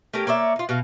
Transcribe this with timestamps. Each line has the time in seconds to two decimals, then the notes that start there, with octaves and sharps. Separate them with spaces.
0.14 A3 C#4 G4 A#4
0.27 A#3 C#5 D5 E5
0.56 D#4 F4
0.69 B2 F#4 F5